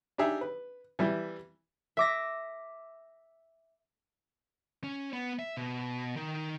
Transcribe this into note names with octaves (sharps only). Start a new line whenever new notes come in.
D4 D#4 G4 G#4 E5
B4
E3 G3 E4
E5 D6 A#6
C#4
B3
E5
B2
D#3